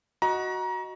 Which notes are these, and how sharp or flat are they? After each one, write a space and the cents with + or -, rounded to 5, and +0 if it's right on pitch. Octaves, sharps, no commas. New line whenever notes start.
F#4 +0 D#5 +0 A#5 +30